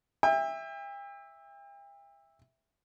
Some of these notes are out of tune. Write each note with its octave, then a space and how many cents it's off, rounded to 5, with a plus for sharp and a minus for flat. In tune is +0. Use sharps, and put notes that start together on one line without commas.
E5 +0 G5 +40